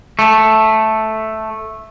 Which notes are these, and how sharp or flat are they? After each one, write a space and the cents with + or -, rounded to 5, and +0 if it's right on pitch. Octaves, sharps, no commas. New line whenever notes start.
A3 -5